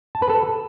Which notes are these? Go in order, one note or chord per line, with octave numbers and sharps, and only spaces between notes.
A5
B4
A4